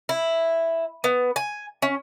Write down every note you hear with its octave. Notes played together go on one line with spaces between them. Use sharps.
E4
B3
G#5
C#4